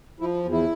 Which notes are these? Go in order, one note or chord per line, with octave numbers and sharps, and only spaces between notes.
F3 E4
E2
E4